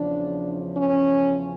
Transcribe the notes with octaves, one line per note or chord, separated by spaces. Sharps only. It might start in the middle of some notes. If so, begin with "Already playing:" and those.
Already playing: E2 C#3 F3 D4
C#4